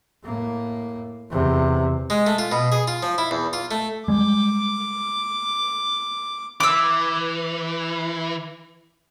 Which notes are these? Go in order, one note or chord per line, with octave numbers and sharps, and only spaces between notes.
A2 A#3
E2 C3
G#3
A3
F4
B2
G#4
F4
F3
E4
E2
F4
A3
G3 G#3 D6
E3 D6 E6